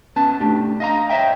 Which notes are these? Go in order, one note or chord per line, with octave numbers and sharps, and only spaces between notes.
B3 C#4 A5
A3 D4 G4
D#5 F5 A#5
C5 C#5 D#5 E5 G5